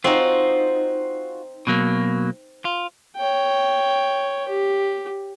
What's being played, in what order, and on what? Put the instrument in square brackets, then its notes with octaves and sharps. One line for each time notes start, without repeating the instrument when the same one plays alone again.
[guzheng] C4 D#4 [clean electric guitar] F4 F#4
[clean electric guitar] B2 F#3 A#3
F4
[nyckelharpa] C#5 G5
G4